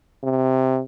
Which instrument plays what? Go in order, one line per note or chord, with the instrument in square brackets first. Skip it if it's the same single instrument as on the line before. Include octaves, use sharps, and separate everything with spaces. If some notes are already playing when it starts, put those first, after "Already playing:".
[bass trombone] C3